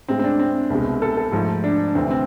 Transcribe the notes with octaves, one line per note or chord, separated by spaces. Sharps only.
A2 G#3 C4
C4
D4
C4
C2 B2 G#3
A4
A4
G#2 F3 A3
D4
D2 C3 E3 C4
C4